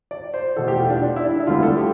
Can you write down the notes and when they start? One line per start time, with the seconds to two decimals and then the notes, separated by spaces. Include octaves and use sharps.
0.11 D5
0.34 C5
0.56 E2 B2 A3 A4
0.68 G4
0.78 F4
0.90 D4
1.02 D4
1.16 E4
1.24 D4
1.40 E4
1.47 D2 D3 G3 B3 F4
1.63 A4
1.78 G4